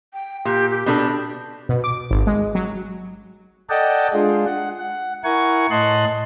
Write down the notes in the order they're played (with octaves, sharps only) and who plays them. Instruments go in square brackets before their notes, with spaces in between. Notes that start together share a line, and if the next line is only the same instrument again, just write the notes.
[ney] G5
[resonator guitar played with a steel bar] A#2 [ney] G4
[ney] G4
[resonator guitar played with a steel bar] B2 D4 A4
[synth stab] B2
D6
G#1
G#3
F#3
[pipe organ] A4 D5 D#5 F#5 G5 A5
G#3 D4 F4 G#4
F#5
F#5
E4 A#4 F#5 G#5 C#6
A2 D#5 A5 C6 F#6